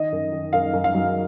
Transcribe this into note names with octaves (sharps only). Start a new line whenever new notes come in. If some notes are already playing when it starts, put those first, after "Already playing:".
Already playing: D#3 D#5
F#2
D#3
F#2 F5
F#2
F5
F#3